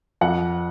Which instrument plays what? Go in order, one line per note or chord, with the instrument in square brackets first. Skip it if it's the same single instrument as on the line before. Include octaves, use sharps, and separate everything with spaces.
[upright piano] F2 F#5